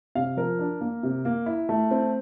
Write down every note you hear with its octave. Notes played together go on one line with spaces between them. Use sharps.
C3 F5
F3 A#4
D4
A#3
C3
A#3
E4
A3
C4